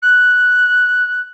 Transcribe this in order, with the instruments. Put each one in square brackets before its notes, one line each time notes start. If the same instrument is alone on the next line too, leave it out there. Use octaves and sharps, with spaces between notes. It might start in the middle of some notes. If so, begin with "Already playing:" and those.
[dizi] F#6